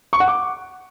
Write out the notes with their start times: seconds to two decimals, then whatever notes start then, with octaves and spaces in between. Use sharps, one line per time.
0.13 C#6
0.20 F#5
0.28 D6